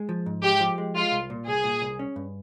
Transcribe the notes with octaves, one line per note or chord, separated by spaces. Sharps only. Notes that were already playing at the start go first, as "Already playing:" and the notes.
Already playing: G#3
F3
G#2
G#3 G4
F3
G#3
G#3 F4
C2
A#2
C2 G#4
A#2
C2
C#4
G2